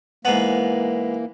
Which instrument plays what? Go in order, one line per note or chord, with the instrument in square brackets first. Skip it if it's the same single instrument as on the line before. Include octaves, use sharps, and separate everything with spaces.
[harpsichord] G#2 B3 [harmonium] E3 A#3